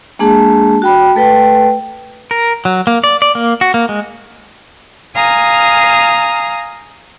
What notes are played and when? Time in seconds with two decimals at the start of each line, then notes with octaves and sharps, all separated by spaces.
0.19 G#3 A#3 D4 G#4 A5
0.82 F#4 G5 B5
1.15 A3 A4 B4 G5
2.31 A#4
2.65 F#3
2.87 A#3
3.04 D5
3.22 D5
3.35 A#3
3.61 F#4
3.74 A#3
3.89 G#3
5.16 F5 G#5 A#5 D#6